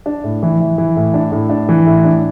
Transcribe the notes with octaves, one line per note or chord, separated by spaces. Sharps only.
D4
A2
E3
E3
E3
A2
D4
A2
D4
E3
A2
D4